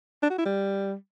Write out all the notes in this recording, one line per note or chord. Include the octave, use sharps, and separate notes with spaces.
D4
F#4
E4
G3